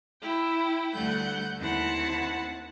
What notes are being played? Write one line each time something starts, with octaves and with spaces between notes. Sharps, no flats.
E4 G5
D2 G3 A3 F#5 G6
D#2 C4 E4 F#5 A5 B5